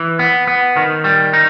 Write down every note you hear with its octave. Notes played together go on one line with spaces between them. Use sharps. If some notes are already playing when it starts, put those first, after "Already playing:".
Already playing: E3
B3
B3
D#3
G3
D#4